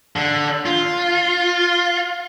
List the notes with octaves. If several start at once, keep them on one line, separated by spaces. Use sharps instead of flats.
D3
F4